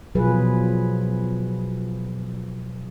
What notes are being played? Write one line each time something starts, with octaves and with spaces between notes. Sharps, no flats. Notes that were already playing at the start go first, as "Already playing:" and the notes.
B2 F3 F#3 F4 G#4 B4